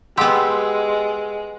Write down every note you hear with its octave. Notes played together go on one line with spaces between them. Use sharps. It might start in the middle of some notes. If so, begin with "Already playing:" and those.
G#3 B3 G4 F#5 C6 E6